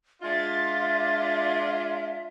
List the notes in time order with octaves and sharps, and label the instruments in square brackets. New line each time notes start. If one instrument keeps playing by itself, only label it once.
[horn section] G#3 D4 F4 [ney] E5 [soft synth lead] A6